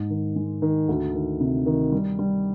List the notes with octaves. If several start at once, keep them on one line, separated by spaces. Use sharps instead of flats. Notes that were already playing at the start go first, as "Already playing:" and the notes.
Already playing: G#2
D#3
G#3
D#3
D2
D#3
C3
D#3
G3
G3